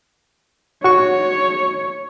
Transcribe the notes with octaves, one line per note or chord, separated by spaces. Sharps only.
F#4 C#5 C#6